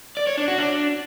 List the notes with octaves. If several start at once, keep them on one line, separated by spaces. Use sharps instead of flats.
D5
C#5
D4
F#4
D4